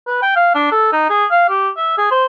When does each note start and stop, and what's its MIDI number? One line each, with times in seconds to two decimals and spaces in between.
0.07 0.21 71
0.22 0.35 79
0.36 0.50 77
0.55 0.67 62
0.72 0.91 69
0.93 1.06 63
1.10 1.26 68
1.31 1.47 77
1.49 1.69 67
1.77 1.97 76
1.98 2.06 68
2.11 2.26 72